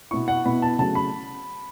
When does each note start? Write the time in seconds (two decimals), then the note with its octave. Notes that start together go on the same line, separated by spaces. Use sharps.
0.11 B2 B3 E4 C#6
0.28 F#5
0.45 B2 B3 E4 B5
0.62 A5
0.79 C#3 F#3 A3 A5
0.95 B5